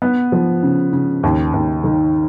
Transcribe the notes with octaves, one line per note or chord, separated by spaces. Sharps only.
B3
F3
C#3
C#3
D#2
D#2
D#3